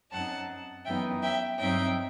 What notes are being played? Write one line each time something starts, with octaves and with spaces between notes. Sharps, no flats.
F#2 F#3 C4 D#4 F#5 A5
F#2 E3 B3 D#4 E5 G5
E5 G5
G2 F#3 C4 D#4 E5 G5